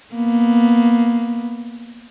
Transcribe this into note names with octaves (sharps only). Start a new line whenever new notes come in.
A#3 B3